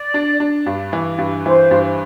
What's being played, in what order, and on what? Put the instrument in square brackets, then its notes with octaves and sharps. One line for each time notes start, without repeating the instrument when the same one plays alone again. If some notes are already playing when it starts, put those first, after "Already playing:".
Already playing: [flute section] D5
[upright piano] D4
D4
G2
E3
G2
[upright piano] E3 [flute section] C5
[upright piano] G2